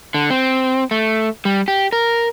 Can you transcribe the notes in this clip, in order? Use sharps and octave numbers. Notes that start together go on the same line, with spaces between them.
D3
C4
A3
G3
G4
A#4